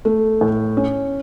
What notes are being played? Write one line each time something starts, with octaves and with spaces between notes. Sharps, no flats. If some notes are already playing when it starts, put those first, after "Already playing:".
A3
A2
C#4